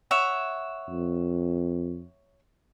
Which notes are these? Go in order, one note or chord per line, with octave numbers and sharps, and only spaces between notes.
C#5 E5 F#5
F2